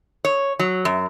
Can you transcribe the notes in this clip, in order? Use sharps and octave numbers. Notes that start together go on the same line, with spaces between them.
C#5
F#3
F#2